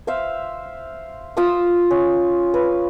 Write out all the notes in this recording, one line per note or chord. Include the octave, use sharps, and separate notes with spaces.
C5 E5 F5
F4 D#6 E6
C#4
B4